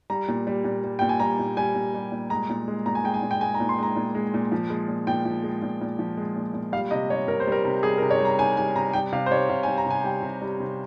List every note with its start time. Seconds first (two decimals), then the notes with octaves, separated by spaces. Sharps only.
0.10 G3 A#5
0.28 A#2
0.47 G3
0.64 A#2
0.84 G3
0.99 A#2 G5
1.09 G#5
1.20 G3 A#5
1.39 A#2
1.57 G3 G#5
1.75 A#2
1.94 G3
2.12 A#2
2.30 G#3 A#5
2.49 A#2
2.68 G#3
2.86 A#2 A#5
2.95 G#5
3.04 G#3 G5
3.14 G#5
3.23 A#2
3.31 G5
3.41 G#3 G#5
3.54 A#5
3.60 A#2
3.69 C6
3.78 G#3 A#5
3.96 A#2
4.15 G#3
4.34 A#2
4.52 F3
4.70 G#3
4.88 A#2
5.07 A#2 G5
5.25 F3
5.44 G#3
5.62 A#2
5.81 A#2
5.99 F3
6.17 G#3
6.36 A#2
6.54 A#2
6.72 G3 F5
6.91 C3 D#5
7.10 G3 C#5
7.28 C3 A#4
7.40 C5
7.47 G3 A#4
7.65 C3
7.83 G3 G#4
7.98 A#4
8.02 C3
8.11 C#5
8.20 G3 A#5
8.39 C3 G#5
8.57 G3 G#5
8.76 C3 A#5
8.93 G3 G5
9.12 C3 F5
9.26 C5
9.31 G3 C#5
9.49 C3 F5
9.63 G#5
9.68 G3
9.78 A#5
9.86 C3 G#5
10.04 G3 G5
10.23 C3
10.42 G3
10.60 C3